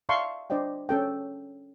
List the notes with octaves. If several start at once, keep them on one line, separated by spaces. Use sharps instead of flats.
D5 E5 F5 A5 C6 C#6
D4 C5 D5 D#5 G5
C#4 A4 G5